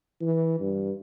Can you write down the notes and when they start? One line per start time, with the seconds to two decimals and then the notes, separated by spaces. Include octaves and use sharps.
0.21 E3
0.60 G2